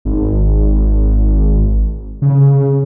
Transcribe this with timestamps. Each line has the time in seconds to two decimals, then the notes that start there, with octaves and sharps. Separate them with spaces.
0.05 G#1
2.22 C#3